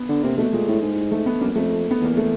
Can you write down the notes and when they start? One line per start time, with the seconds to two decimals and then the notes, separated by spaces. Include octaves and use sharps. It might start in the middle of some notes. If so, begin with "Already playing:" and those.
Already playing: B3
0.09 D3
0.23 C3 A#3
0.38 B2 A3
0.53 A#2 G#3
0.68 A2
0.82 G#2
1.11 A3
1.26 B3
1.41 F#2 A#3
1.56 F2 A3
1.91 B3
2.01 E2 A#3
2.17 A3